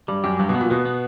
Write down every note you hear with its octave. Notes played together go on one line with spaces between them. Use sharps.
G2 G3
F#2 G4
G2 F#3
B2
B3
A#2
B2 B3
B3